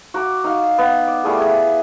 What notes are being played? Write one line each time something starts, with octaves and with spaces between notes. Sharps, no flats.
F#4 A#5 D6
D#4 F5
B3
D5
G3 A3 E4 G#4
G#4